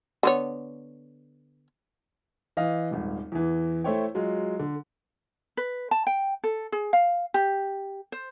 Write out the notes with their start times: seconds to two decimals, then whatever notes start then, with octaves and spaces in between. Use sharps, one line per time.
0.23 D3 B3 C#5
2.57 E3 D#5 F5
2.91 D#1 G#1
3.32 E2 E3
3.84 A3 E4 C5 C#5 G5
4.15 F#3 G#3 F4
4.59 D3
5.57 B4
5.91 A5
6.07 G5
6.44 A4
6.72 G#4
6.93 F5
7.34 G4
8.12 C5